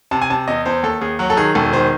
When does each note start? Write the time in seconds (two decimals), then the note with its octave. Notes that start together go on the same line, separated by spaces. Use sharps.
0.11 C3 A5
0.22 G#5
0.30 C3 A5
0.48 E2 D#5
0.65 E2 C5
0.83 D#2 A4
1.01 D#2 G#4
1.19 F#3 F#4
1.30 A4
1.37 D#3 G#4
1.55 E1 A4
1.73 D#3 C5